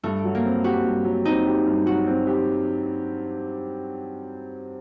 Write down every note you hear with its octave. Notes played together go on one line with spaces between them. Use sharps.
G2 A3
F#3
A#3
C4
F#4 G4
G2
F#3
C4 D#4
G4
G2
F#3 F#4
C4
G4